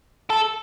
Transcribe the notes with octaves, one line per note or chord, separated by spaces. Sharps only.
A4